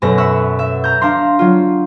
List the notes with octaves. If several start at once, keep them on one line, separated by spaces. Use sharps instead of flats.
F#2 B2 B3 A4 F#6 A#6
E5 C#6 E6 F#6 B6
E5
A#5 G6
D4 F5 A#5 C6
F#3 F4